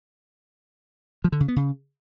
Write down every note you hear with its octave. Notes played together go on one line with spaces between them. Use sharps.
F3
D3
C#3
B3
C#3